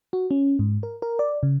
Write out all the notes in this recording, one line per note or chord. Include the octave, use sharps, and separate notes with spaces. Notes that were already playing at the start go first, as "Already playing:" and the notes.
F#4
C#4
G#2
A#4
A#4
D5
C#3